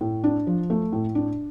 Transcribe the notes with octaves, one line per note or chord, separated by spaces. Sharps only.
A2
D4
F3
A3
A2
D4